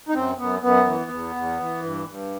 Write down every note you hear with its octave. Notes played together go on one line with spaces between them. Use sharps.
D#4
F#2 C4
F#2 B3
F#2 B3
E3
E2
E2
E3
G2
G2